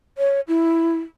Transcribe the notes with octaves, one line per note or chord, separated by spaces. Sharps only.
C#5
E4